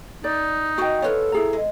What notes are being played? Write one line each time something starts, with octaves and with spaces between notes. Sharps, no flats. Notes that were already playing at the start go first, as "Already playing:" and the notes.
D#4 D5
F#4 G#4 D5 D#5 G5
B3 F4 G4 A4 B4 C#5
E4 G#4 A#5
G#3